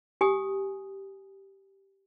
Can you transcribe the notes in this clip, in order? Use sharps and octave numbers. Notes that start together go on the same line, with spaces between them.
G4 G#5 D#6